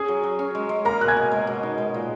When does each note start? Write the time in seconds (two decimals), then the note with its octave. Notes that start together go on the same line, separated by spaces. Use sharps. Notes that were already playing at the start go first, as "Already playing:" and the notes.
Already playing: C#4 G#4 G#5
0.08 F#3
0.23 F#3
0.39 C#4
0.55 G#3
0.69 G#3
0.85 A#3 A#4 A#5
1.01 B2 F#6
1.08 G#5 G#6
1.17 G#4
1.32 G#3
1.47 B2
1.63 D#4
1.78 G#3
1.94 A#2